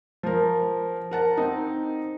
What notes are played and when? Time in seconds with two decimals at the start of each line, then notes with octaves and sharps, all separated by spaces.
0.23 F3 A#4
1.11 A#4 F#5 A5
1.37 C4 D#4